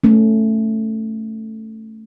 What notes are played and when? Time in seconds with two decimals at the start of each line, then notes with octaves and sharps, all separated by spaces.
0.04 A3 C#4